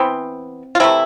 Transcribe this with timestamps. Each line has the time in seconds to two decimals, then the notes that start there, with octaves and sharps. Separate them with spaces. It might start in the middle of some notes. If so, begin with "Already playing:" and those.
Already playing: E3 B3 C4
0.75 F4
0.80 C3 E3 A3 E4